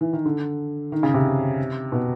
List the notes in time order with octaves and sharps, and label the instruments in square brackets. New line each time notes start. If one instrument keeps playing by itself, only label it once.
[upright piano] E3
D#3
D3
D#3
C#3
C3
B2